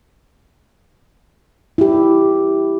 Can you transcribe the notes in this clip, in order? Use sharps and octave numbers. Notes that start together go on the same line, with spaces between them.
E4 G4